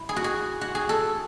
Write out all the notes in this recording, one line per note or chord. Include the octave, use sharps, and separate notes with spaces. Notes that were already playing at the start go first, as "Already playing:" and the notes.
Already playing: E4
G#4
F#4
G#4
F#4
G#4
A4